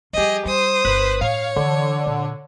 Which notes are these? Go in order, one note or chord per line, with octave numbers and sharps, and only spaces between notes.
F3 G3 G4 G#4 D#5
G3 C5 D#6
G1 B4
A2 C#5 F5
D3 E3
A#2